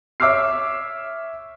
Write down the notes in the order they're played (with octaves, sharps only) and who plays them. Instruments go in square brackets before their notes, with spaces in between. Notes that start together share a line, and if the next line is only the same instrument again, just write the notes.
[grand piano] C#5 E5 D6 E6 F6 C7